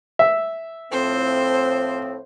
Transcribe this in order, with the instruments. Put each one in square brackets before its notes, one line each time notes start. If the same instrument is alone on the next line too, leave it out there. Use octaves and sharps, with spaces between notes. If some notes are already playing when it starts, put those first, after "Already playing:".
[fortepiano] E5
[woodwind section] A2 F3 C4 [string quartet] C5